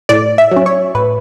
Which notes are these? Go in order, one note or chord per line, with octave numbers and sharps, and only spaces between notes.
A2 D5
E5
F#3 C#4
C#5
A2 B4